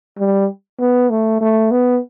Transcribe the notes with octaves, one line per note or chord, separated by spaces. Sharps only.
G3
B3
A3
A3
B3